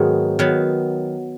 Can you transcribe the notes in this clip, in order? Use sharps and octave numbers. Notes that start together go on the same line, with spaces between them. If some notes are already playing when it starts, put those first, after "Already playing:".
Already playing: G#2 D#3 F#3 B3 D#4
D#3 F#3 B3